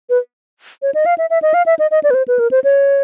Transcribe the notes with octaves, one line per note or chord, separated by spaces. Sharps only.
B4
C#5
D#5
F5
E5
E5
D#5
F5
E5
D#5
D#5
D5
B4
C5
B4
A#4
C5
C#5